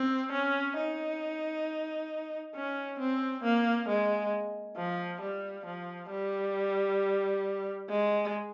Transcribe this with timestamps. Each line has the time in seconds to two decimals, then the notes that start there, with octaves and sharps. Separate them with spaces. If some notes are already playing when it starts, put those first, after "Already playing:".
Already playing: C4
0.32 C#4
0.77 D#4
2.55 C#4
2.99 C4
3.44 A#3
3.88 G#3
4.77 F3
5.21 G3
5.66 F3
6.10 G3
7.89 G#3